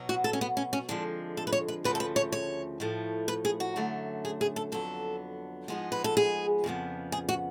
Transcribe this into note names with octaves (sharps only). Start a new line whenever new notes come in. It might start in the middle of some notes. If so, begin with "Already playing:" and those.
Already playing: B2 F#3 B3
F#4
A4
C#4
B3
C#4
C#4
F2 D3 F3 G#3 D4
A4
B4
C#5
B4
D2 C#3 F3 A3 B4
A4
B4
C#5
C#5
A2 F3 A3
B4
G#4
F#4
F#2 D3 F#3 A3
G#4
G#4
A4
F2 D3 F#3 B3 A4
G#2 F3 G#3 B3
B4
A4
G#4
F2 C#3 F3 B3
G#4
F#4